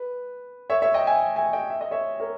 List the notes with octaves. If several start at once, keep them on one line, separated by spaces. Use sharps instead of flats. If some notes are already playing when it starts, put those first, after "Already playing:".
Already playing: B4
C#5 E5
C#5 E5
D#5 G5
E5 G#5
E5 G#5
D#5 G5
E5
D#5
C#5 E5
A#4 C#5